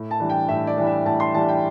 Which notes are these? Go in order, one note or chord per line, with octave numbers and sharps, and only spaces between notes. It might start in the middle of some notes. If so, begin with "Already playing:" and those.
Already playing: A2
A5
E3 G3 D4
G5
A2 E5
D5
E3 G3 D4
E5
A2 A5
C6
E3 G3 D4 A5
G5